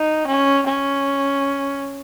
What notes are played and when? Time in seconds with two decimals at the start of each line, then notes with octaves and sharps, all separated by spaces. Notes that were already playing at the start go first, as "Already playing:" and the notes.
Already playing: D#4
0.28 C#4
0.66 C#4